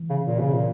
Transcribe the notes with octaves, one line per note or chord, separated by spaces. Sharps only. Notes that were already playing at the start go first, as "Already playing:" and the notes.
Already playing: E3
C#3
A#2
C#3
A#2